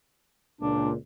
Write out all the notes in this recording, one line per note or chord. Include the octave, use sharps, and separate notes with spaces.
C#2 A#2 D4